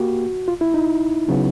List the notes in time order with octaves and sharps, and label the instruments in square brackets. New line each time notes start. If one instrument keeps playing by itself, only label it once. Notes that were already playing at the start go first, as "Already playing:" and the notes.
Already playing: [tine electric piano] A#3 G4 [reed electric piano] F#4
[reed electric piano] F4
E4
D#4
[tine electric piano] C#3 F#3 B3